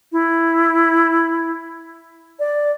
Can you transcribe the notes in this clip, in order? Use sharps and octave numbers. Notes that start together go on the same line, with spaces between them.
E4
D5